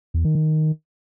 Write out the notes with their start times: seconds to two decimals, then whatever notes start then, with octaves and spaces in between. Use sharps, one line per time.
0.14 E2
0.25 D#3
0.35 D#3